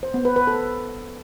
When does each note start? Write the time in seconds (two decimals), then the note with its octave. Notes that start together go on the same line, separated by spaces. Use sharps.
0.03 C5
0.14 B3
0.25 B4
0.36 B4
0.47 A4